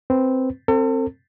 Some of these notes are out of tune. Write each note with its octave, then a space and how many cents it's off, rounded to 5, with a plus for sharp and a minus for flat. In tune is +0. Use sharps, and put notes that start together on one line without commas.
C4 +0 B4 +0
C4 +15 A4 +40